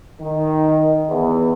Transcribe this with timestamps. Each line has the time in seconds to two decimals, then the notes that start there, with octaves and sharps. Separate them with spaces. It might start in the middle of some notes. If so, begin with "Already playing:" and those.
0.20 D#3
1.08 E2